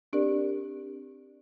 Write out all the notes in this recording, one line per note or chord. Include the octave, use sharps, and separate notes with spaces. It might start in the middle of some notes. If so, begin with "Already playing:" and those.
C4 D4 G4 A#4 D5